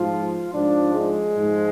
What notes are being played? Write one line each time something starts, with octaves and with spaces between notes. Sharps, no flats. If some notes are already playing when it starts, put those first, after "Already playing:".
Already playing: G#2 F3 F4
G#2 F3 D4
G#3
G#2 F3